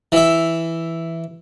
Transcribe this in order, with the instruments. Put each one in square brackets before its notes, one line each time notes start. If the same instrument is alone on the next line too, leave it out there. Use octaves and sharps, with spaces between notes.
[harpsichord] E3 E5